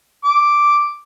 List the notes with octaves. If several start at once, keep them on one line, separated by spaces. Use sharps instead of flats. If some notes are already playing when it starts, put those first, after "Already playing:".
D6